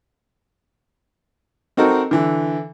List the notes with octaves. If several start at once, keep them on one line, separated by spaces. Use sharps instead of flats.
C4 D#4 F#4 A4 A#4
D3 E3